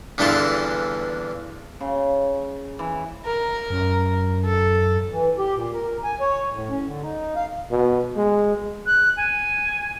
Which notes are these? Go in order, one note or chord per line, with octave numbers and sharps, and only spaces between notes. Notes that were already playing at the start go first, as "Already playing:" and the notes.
E2 G2 D3 E3 F4 A5
C#3
E3
A#4
F#2
A4
E3
G4
A#2
A#4
G#5
C#5
A2
C#4
D3
D#4
F5
B2
G#3
F#6
G#5